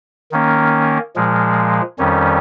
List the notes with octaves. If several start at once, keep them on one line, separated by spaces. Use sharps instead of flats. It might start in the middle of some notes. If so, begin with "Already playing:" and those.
D#3 A#3 C#4
A#2 F3 G#3
F2 D#3 G3 C#4